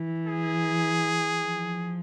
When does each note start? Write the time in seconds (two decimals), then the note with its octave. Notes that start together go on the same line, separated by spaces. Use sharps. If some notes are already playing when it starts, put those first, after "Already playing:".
Already playing: E3
0.27 G#4
1.44 F3